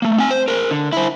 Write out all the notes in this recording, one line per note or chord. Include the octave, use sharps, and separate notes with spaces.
A3 A#3
C4 G#5
C5
A#4 C5
D3
E4 C5